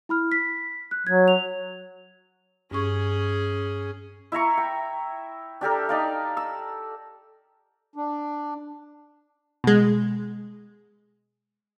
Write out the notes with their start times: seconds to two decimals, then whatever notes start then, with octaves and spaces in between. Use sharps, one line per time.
0.09 E4 B5 F6
0.32 B6
0.91 F#6
1.07 F#3 G#6
1.28 F7
2.71 G2 C#4 G#4 C#6
4.32 E4 E5 A#5 C#6
4.58 G5
5.61 D4 G4 A4 A#4
5.89 D#4 D5 F5
6.37 E6
7.96 D4
9.64 B2 G#3